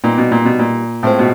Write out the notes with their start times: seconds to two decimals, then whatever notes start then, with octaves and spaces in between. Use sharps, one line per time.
0.04 A#2 G3 B3 D#4 G4
0.18 B2
0.32 A#2
0.45 B2
0.59 A#2
1.03 A2 G#3 C4 F4 G#4 C5
1.19 B2